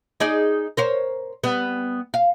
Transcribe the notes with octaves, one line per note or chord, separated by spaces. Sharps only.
D#4 G#4 D5
A#4 C5 C#5
G3 B3
F5